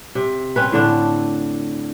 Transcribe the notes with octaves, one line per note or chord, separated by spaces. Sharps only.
C3
C4 C#4 B4
A2 D3 D4